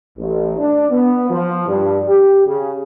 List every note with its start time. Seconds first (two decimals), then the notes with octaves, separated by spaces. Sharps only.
0.18 A1
0.58 D4
0.91 B3
1.30 F3
1.68 G2
2.07 G4
2.46 C#3